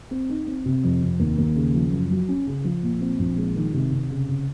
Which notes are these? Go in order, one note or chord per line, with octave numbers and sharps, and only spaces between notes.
C4
D#4
C4
C3
F2
C3
D#2
D#2
C#3
F3
F#2
F#3
C#4
C#3
F3
A#2
C4
A#1
G#3
D#3
C3
C3
C#3
C#3